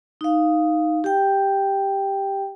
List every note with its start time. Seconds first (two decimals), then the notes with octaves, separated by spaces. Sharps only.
0.21 D#4 F5
1.04 G4 G5